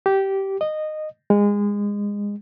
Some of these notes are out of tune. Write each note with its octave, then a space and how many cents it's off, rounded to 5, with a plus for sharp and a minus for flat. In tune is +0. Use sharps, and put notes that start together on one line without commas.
G4 -15
D#5 -15
G#3 -25